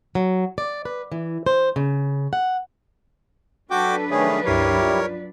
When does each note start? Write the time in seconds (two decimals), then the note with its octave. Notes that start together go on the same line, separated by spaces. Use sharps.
0.15 F#3
0.58 D5
0.85 B4
1.12 E3
1.46 C5
1.76 C#3
2.33 F#5
3.71 F#3 D4 F#4 A4 B4 G5 D6
4.11 D#3 A3 C#4 G#4 C#5 E5 B5
4.46 C#2 G2 G3 E4 G4 A#4 C#5 C7
4.81 F4 D5